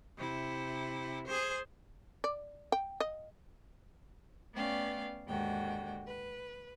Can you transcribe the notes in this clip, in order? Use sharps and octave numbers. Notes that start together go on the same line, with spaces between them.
C3 E4
G#4 C5
D5
G5
D#5
A3 B3 C#4 D5 F5 G5
D#2 G#2 D3 F#4 G5
B4